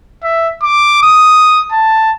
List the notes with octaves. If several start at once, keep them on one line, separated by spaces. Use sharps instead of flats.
E5
D6
D#6
A5